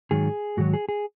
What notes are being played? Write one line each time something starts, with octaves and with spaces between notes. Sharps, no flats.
G#2 D#3 F#3 G#4
G#2 D#3 F#3 F#4
G#4
G#4